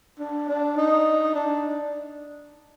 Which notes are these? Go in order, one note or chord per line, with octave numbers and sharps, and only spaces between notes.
D4
D4
D#4
D4